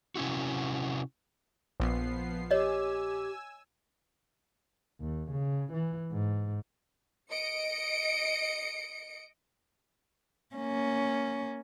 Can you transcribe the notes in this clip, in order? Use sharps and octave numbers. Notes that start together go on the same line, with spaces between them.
C3 C#4 E4 F#4
A#1 F3 B3 C7
G4 C#5 D#5 G#5 E6
D#2
C#3
E3
G#2
D#5 C#7 D7
A#3 C#4